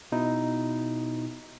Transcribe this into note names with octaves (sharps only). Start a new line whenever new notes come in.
B2 D#4 E4